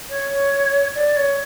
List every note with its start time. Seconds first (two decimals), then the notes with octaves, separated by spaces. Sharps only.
0.09 C#5
0.95 D5
1.16 C#5